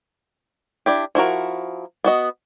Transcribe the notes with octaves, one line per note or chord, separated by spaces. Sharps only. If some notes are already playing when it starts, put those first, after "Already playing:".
D4 E4 G4
F3 E4 F#4 A#4
B3 F#4 D#5